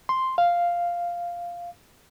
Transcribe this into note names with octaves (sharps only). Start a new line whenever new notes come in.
C6
F5